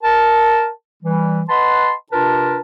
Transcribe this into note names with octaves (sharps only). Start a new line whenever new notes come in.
A#4 A5
E3 G3
B4 D#5 F#5 A5 B5 C6
C3 D4 F4 A#4 B4 A5